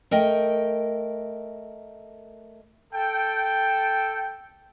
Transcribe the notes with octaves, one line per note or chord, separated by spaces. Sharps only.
A3 A#4 D#5 G5
A4 G5